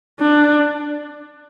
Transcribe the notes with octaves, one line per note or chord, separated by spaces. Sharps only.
D4